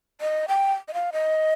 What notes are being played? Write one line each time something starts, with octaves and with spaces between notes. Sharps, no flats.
D#5
G5
D#5
F5
D#5